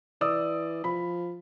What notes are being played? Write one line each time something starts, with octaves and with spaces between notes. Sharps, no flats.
E3 D5 D#6 E6
F3 B5